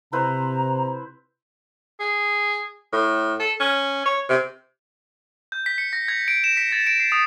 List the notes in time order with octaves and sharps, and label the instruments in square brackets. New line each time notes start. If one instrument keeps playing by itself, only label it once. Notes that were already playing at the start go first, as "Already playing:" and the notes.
[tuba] C3 [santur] E4 B4 C5 [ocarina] A#5
[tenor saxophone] G#4
A2
A4
C#4
C#5
C3
[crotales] G6
B6
C#7
A#6
G#6
D7
E7
B6
A6
D7
C7
D#6